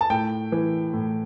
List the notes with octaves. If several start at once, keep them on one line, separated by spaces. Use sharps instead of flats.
A5
A2 G5
E3
A2